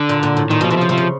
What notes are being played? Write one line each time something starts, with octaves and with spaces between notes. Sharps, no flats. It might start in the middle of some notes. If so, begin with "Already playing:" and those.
Already playing: D3
A#2
A#2
A2
A#2 D#3
B2 F3
C3 E3
C#3 F3
C3 F3
C#3